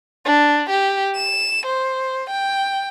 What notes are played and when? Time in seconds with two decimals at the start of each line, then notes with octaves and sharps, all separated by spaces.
0.25 D4
0.70 G4
1.15 E7
1.66 C5
2.30 G5